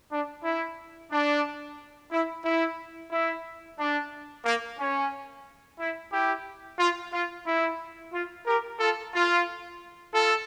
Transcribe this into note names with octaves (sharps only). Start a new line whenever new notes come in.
D4
E4
D4
E4
E4
E4
D4
A#3
C#4
E4
E4 G4
F4
F4
E4
F4
G4 A#4
F4 A4
F4
F4 A4